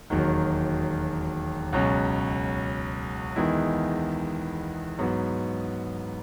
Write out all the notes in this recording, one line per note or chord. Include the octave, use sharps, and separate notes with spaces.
E1 D#2 D#3 F#3
C#2 B2 F#3 C#4
E2 D#3 G#3 B3 E4
G#2 F#3 B3